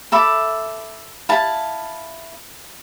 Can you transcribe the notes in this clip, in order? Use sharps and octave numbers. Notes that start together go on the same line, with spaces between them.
A4 E5 B5 D6
E4 F5 A5